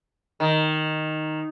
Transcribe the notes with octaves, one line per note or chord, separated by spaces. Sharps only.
D#3